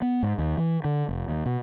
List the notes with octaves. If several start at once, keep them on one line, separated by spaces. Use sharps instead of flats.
B3
G#2
D#2
E3
D3
F1
D#2
B2